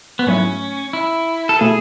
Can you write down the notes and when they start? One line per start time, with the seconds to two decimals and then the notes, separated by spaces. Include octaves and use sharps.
0.19 B3
0.27 G#2 F#3 A3 C#4 E4
0.93 E4
1.49 A4
1.59 B2 A3 E4 G#4 A4